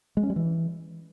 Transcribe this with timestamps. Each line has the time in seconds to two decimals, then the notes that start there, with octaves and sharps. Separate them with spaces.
0.17 G#3
0.23 C#4
0.30 G3
0.36 E3